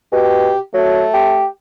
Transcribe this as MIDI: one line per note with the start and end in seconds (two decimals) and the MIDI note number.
0.12 0.51 47
0.12 0.59 67
0.74 1.04 54
0.74 1.43 57
1.14 1.46 67